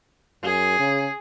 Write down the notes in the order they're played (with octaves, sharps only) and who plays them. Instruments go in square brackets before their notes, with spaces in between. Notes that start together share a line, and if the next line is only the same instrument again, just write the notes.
[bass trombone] F#2 [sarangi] G#4
[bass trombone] C#3